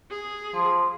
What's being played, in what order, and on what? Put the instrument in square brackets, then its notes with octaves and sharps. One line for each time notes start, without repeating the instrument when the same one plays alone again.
[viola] G#4
[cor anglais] F3